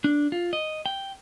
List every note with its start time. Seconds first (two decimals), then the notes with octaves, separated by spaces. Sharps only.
0.04 D4
0.32 F4
0.53 D#5
0.86 G5